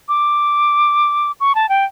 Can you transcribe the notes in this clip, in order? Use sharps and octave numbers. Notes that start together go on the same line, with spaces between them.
D6
C#6
A5
G5